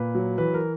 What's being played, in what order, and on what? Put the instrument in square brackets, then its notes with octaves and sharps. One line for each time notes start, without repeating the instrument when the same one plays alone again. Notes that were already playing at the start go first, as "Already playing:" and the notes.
Already playing: [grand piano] A#2 B4
F#3
E3 B4
A#4